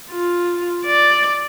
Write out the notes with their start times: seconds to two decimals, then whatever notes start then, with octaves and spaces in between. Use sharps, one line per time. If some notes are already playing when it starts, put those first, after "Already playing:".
0.10 F4
0.86 D5